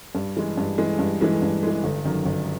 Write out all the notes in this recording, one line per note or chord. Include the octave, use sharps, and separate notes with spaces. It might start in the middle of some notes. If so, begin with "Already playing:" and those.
G2
E3 G#3
G2
E3 G#3
G2
E3 G#3
G2
E3 G#3
G1
F#2 D#3
G1